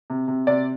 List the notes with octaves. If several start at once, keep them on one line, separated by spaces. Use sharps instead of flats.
C3
C3
C3 D5